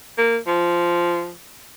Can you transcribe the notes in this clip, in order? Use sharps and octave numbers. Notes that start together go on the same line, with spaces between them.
A#3
F3